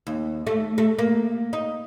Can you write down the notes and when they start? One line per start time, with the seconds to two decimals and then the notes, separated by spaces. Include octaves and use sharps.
0.07 D#2
0.47 A3
0.78 A3
0.99 A#3
1.53 D#4